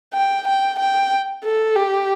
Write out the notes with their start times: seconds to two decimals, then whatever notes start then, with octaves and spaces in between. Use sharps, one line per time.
0.14 G5
0.47 G5
0.79 G5
1.44 A4
1.76 G4